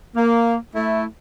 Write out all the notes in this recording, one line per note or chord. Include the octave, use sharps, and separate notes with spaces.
A#3
A3 E4